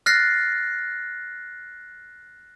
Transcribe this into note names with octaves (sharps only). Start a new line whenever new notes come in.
F6 F#6 A6 A#6 C7